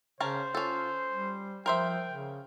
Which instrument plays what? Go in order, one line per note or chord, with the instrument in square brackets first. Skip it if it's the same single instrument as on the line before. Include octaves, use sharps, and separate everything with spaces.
[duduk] C#3 [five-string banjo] C#4 A#4 A5 [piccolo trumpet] C5
[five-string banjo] C#4 A4 [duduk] F4
[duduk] G3
[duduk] F3 [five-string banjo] A#4 C5 E5 [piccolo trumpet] G5
[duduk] C#3